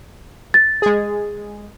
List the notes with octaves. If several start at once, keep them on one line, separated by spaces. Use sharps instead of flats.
A6
G#3 G#4